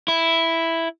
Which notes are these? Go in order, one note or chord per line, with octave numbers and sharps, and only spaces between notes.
E4